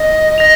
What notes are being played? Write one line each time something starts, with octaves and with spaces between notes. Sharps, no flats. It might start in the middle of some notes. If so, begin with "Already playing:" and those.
Already playing: D#5
A#6 F7